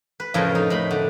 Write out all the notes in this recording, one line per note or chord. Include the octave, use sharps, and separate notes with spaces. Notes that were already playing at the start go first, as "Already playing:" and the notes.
B4
F2 A2 C#3 F3 A#4 D#5
D#4
A2 B5
D3